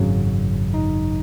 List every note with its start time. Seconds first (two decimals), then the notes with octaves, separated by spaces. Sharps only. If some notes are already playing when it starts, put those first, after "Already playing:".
Already playing: G#1 F#2 C#3 F#3
0.74 D#4